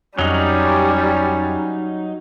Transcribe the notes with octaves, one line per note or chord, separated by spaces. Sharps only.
F2 F#3 G3 C#4 D#4